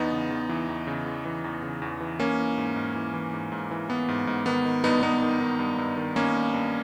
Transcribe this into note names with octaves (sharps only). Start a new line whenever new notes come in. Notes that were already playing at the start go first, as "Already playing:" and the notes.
Already playing: E2 B3 D#4
C#3
E2
E3
E2
C#3
E2
E3
E2
C#3
E2
E3
E3 A#3 C#4
E3
G#2
G#2
E3
E3
G#2
G#2
E3
E3 B3
G#2
G#2
D#3 B3
D#3
G2 B3 D#4
G2 B3 D#4
D#3
D#3
G2
G2
D#3
D#3 A#3 C#4
G2
G2